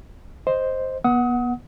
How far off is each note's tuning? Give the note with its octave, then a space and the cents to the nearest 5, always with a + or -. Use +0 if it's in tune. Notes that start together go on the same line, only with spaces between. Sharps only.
C5 +5 D#5 +0
B3 -35 F#5 +0 D#6 +30